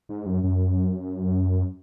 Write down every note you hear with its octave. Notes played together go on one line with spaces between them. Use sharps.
G#2
F#2
F#2